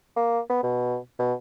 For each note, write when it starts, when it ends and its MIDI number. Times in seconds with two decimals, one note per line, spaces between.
0.16 0.40 58
0.49 0.62 59
0.63 0.97 47
1.19 1.34 47